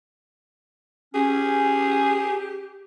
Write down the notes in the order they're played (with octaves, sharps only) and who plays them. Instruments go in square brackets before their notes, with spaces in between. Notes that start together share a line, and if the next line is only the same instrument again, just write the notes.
[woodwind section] C#4 [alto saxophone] G4 [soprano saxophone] G#4